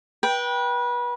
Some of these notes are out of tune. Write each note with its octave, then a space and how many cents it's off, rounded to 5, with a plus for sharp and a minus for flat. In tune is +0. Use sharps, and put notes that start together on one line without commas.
B4 -30 G5 +0